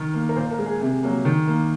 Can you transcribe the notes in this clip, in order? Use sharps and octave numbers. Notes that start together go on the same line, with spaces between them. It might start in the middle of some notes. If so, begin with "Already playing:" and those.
Already playing: D#3 A#4
A#3
A#4
A#2 C5
A#4
G#3
G#4
C3 G#4
F#3 A#3
D#3
A#3